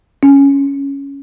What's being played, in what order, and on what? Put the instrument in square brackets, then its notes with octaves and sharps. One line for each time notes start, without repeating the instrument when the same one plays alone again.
[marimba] C#4